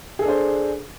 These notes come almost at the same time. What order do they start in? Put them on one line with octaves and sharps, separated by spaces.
G#4 A4 D4 C5